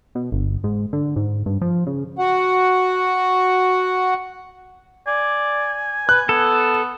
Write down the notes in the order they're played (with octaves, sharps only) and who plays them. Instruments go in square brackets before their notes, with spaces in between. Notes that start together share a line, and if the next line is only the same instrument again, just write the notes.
[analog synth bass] B2
G1
G#2
D3
G#2
G2
F3
C#3
[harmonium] F#4 F#5
[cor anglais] D5 [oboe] G#5
[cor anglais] B4 [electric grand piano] F#6
[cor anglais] B3 [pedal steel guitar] A4